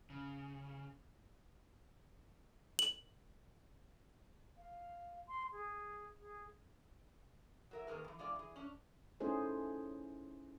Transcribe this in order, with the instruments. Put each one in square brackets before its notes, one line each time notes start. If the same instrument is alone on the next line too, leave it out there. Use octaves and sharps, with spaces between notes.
[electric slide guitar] C#3
[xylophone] F#7
[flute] F5
C6
G#4
G#4
[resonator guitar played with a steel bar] F#3 A#4 E5
D#3 A#3 G#4 A#4 B4
B2 E3
E3 G#3 F4 D5
E3 G#4
C#4 D4
[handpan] A3 C#4 D#4 E4 G#4 C5